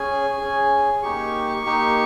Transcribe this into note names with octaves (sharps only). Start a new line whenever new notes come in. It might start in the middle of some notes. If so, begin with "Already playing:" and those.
Already playing: C#4 G#4 G#5
C#4 G#4
A#3 D#4 G4 C#6
A#3 D#4 G4